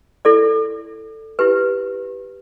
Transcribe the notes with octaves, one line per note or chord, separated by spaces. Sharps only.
E4 A4 D5
E4 G4 B4